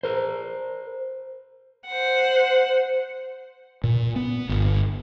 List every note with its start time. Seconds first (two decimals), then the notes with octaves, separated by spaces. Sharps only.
0.03 A#4 C5
1.87 C5 F#5
3.84 A#2
4.16 B3
4.49 G1